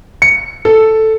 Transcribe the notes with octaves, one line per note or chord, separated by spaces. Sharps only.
C#7
A4